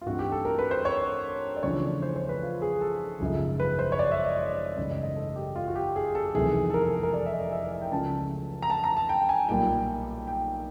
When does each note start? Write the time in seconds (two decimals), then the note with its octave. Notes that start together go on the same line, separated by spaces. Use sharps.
0.01 F4
0.06 G2 E3 A3 C4 D#4 F#4
0.19 G4
0.32 A4
0.45 A#4
0.59 B4
0.71 C5
0.85 C#5
1.56 D5
1.63 E2 C#3 F3 A3 D4 C#5
2.02 C5
2.16 C5
2.29 B4
2.42 F4
2.62 G#4
2.81 A4
3.20 G#1 F#2 C#3 F3 G#3
3.60 B4
3.79 C5
3.92 C#5
3.99 D5
4.11 E5
4.25 D#5
4.77 G#1 F#2 C#3 E3 A3 D#5
4.91 D#5
5.03 D#5
5.16 A4
5.36 G4
5.56 F4
5.68 F#4
5.76 G4
5.96 G#4
6.15 A4
6.34 F1 E2 C3 D#3 G#4
6.70 A4
6.74 A#4
6.83 A4
7.03 A#4
7.14 D5
7.26 E5
7.33 D#5
7.52 E5
7.72 E5
7.81 G5
7.91 C#2 C#3 F3 A3 C#4 A5
8.62 A#5
8.70 A5
8.84 A#5
8.97 A5
9.09 G5
9.29 G#5
9.49 B1 A#2 G3 A#3 G5
10.27 G5